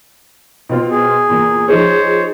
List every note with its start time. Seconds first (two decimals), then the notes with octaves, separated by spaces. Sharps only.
0.69 B2 C4 F4
0.90 G#4
1.28 E2 A#2
1.68 F3 D#4 G#4 C5 C#5